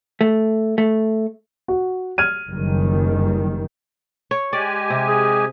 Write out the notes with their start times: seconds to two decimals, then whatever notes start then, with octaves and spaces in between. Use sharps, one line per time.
0.21 A3
0.78 A3
1.68 F#4
2.18 F6 G#6 D#7
2.50 F#1 D#3 G3
4.31 C#5
4.53 G#3 G4 D5 G#5
4.90 C3
5.07 G#4